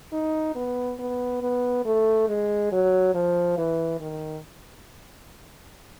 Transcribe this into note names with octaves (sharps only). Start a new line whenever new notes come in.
D#4
B3
B3
B3
A3
G#3
F#3
F3
E3
D#3